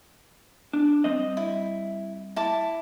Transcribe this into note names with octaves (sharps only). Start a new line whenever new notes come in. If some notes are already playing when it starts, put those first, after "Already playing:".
D4
G3 C4 D#5
E4
E4 A5 D6